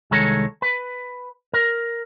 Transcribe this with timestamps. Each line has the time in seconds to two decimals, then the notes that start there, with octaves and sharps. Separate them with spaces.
0.11 C2 D#3 G#3 A4 C#5 A#5
0.62 B4
1.53 A#4